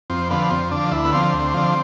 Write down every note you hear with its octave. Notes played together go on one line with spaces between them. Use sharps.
F2 C4
D3 F3 B3
F2 C4
D3 F3 D4
D2 E4
B3
D3 F3 C4
D2
D3 F3